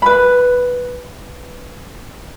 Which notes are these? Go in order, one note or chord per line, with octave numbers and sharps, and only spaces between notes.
B4 B5